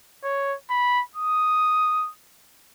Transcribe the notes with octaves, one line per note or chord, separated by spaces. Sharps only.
C#5
B5
D#6